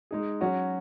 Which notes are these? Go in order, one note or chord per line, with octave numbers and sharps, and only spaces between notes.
G#3 D#4 G#4
F#3 C#4 F#4